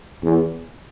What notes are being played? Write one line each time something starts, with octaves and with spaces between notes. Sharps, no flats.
E2